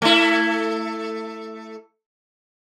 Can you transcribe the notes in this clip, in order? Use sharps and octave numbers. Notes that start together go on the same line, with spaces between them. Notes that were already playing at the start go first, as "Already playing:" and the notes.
A3 E4